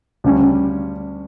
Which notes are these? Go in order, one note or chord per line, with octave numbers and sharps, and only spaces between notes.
D2 C#3 G3 C#4